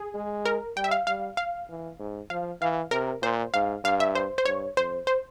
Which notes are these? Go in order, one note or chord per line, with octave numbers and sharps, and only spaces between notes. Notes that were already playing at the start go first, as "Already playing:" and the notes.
Already playing: G#4
G#3
A#4
G3 G5
E5
F5
G3 F5
F5
E3
G#2
F3 F5
E3 F5
C3 A#4
A#2 C5
G#2 F5
G2 F5
E5
C5
C5
G2 C#5
F2 C5
C5